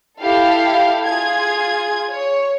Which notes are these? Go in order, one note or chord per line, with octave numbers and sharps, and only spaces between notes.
E4 G4 A4 F5
F4 G#4 G#6
C#5